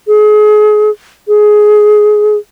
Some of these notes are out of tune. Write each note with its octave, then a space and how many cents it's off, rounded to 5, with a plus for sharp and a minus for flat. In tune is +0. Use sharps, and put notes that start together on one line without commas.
G#4 +30
G#4 +15